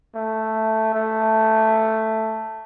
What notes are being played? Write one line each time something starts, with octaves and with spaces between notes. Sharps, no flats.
A3
A3